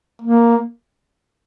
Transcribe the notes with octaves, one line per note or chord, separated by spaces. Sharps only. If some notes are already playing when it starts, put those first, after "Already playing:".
A#3